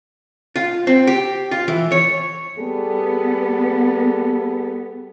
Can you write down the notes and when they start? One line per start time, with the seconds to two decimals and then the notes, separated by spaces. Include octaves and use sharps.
0.56 F4
0.87 C4
1.07 G4
1.51 F4
1.68 E3
1.92 C#5
2.58 G3 B3 G#4 A4